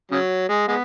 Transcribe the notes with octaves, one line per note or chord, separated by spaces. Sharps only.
C#3 F#3
G#3
G#3 B3